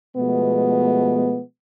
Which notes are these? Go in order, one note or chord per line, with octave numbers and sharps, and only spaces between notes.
B2 F3 G#3 A3 B3